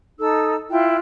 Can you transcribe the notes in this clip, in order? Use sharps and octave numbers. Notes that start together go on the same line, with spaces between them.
D#4 A4 E6
E4 F4 G5 F#6